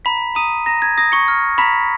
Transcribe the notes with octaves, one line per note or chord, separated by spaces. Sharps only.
A#5 B5 B6
A#5 D#6 D#7
A#5 A#6
G#6
D#6 A#6
C#6 C#7
F6
A#5 B5 B6